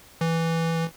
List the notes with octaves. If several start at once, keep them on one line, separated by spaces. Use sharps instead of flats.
E3